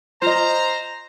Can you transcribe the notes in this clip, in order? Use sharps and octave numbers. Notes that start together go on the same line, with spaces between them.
F4 C5 D#5 A#5